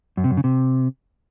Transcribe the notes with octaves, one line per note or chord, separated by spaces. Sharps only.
F#2
C3
F#2
C#3
C3